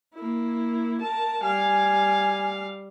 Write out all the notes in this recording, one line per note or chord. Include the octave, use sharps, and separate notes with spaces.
A#3 E4
A#4 A5
G3 F5 G#5